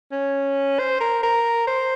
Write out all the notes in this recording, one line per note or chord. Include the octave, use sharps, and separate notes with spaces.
C#4
C5
A#4
A#4
C5